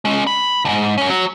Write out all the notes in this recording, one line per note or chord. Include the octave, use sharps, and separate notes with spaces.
G#3 C#4
B5
D2 G#2
F#2 C#4
F#3